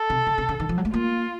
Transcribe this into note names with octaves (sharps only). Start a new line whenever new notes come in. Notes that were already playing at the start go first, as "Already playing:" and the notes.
Already playing: A4
C3
C#3
C3
C#3
D#3
F3
F#3
A3
A#3 F4